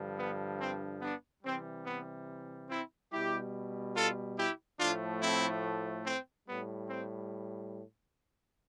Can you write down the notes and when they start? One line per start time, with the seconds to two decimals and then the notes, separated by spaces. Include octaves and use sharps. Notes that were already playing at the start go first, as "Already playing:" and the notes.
Already playing: G2 D3 F3
0.18 B3
0.60 C4
1.02 B3 D4
1.43 C3 E3 G3 C4
1.86 B3
2.69 C4 E4
3.12 B2 G3 E4 G4
3.95 F4 A4
4.37 E4 G4
4.79 A2 F3 A3 D4 F4
5.21 C4 E4
6.05 C4
6.47 A2 G3 B3
6.89 C4